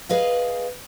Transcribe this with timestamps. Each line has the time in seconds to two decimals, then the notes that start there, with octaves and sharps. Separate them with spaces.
0.09 G#4 B4 D#5 F5